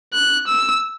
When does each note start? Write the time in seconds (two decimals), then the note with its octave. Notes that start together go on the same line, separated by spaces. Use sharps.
0.13 F#6
0.47 E6